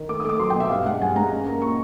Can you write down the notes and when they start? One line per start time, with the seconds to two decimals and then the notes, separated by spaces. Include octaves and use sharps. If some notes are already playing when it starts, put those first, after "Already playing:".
Already playing: D#3
0.09 A3 D6
0.20 D#6
0.25 A3 D6
0.39 F#3 C6
0.50 G5
0.54 B2
0.60 E5
0.70 G2 F5
0.85 G#3 F#5
1.00 G2 G#5
1.16 G#3 A#5
1.32 C#4
1.46 A#3
1.62 A#2 C#6